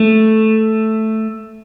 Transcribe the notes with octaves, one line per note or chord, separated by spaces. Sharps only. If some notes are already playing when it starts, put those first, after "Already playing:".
Already playing: A3